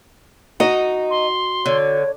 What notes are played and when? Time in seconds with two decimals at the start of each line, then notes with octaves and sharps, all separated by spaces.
0.60 D#4 F#4 D#5
1.10 C6
1.66 D3 C#5